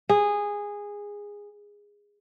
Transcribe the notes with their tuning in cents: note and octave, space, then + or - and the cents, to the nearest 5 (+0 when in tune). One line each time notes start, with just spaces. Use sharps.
G#4 -15